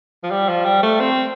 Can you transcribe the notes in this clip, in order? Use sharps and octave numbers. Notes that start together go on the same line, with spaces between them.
F3
G3
F3
G3
A3
C4